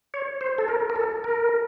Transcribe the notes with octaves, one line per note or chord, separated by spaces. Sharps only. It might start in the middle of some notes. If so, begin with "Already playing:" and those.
C#5
C5
A4
A#4
A#4
A4
A#4